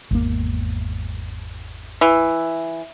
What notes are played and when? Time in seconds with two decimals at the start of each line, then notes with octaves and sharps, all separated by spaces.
0.11 G#1 E2 A#3
2.01 E3